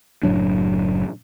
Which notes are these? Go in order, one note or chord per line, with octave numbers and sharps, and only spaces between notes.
F#1 A2 F#3 D4